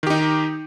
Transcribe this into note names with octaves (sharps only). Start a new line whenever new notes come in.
D#3 D#4 G4